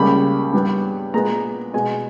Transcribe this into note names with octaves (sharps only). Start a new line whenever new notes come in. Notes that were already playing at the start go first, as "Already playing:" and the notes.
Already playing: C#2 C#3 G3 A#3 B5
G2 G3 B3
A#2 G#3 B3 A#5
B2 G#3 B3 G#5